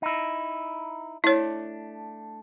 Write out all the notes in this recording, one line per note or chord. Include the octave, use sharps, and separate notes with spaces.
D#4 E4
A3 D4 E4 C#5